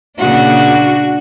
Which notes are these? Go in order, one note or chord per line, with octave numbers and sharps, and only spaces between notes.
A#2 C#3 D4 F#4